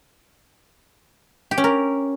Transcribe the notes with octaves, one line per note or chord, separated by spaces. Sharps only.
G4
C#4
A#4